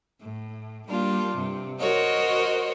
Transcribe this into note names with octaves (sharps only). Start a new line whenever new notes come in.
A2
G3 A#3 D4 F4
G2 C3
F#4 A#4 C5 C#5 D#5